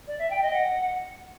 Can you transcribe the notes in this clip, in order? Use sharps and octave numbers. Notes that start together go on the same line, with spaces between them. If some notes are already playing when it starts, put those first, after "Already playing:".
D5
E5
G5
D#5
F#5